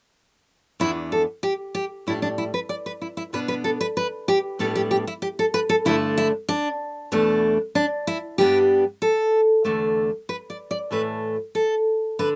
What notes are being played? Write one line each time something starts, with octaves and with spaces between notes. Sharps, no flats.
E2 E3 B3 D4 E4
A4
G4
G4
A2 G3 D4 E4
D4
E4
B4
D5
B4
E4
E4
B2 B3 D4 B4
B4
A4
B4
B4
G4
A2 G3 B3 D4 A4
G4
G4
E4
G4
A4
B4
A4
G2 D3 A3 D4 E4
E4
D4
E2 B2 A3 D4
D4
E4
G2 G3 B3 D4 G4
A4
E2 D3 A3 D4
B4
D5
D5
A2 E3 A3 B4
A4
D3 B4